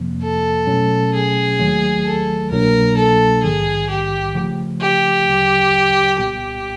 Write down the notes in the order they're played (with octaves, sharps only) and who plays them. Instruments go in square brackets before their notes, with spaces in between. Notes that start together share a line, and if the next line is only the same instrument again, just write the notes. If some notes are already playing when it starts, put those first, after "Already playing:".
Already playing: [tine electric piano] F2 C3 F3 A#3
[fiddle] A4
[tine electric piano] B2 F#3 A3 C#4
[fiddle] G#4
[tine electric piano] D#2 D#3 F#3 A3
[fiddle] A4
[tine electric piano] C2 B2 F#3 A#3 D4 [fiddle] A#4
[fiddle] A4
[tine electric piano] A#1 G#2 D#3 G3 [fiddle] G#4
[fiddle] G4
[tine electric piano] C#3 F3 A3
[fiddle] G4
[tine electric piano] D2 C#3 F#3
[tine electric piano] C2 A#2 G3 B3 [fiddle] G4